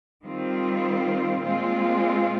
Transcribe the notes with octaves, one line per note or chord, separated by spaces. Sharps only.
D#3 G3 C4 F4
A#2 G#3 C4 F4